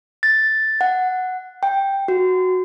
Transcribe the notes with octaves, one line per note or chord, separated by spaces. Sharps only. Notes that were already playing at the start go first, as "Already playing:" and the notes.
A6
F#5
G5
F#4